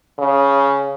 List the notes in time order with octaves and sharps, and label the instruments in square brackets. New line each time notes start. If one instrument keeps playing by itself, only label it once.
[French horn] C#3